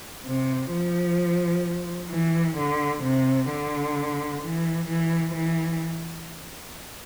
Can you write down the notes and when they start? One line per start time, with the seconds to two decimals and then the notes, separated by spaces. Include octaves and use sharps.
0.25 C3
0.71 F3
2.10 E3
2.56 D3
3.03 C3
3.50 D3
4.42 E3
4.88 E3
5.35 E3